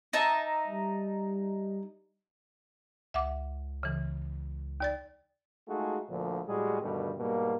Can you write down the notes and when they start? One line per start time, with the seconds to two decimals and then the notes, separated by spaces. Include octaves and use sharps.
0.13 D#4 E5 A5
0.67 G3
3.14 C#2 E5 F#5 D6
3.83 C#3 E3
4.80 D#2 D5 A6
5.69 G#3 A3 D#4 F4 F#4 G#4
6.09 D2 A#2 D3 F3
6.47 A2 G3 G#3 F#4 G#4
6.82 G2 B2 D3 D#3 G3 A3
7.18 G#2 B2 G3 A#3